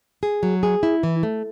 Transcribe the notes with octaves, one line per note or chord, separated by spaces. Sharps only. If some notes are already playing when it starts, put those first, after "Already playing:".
G#4
F#3
G#4
E4
E3
A3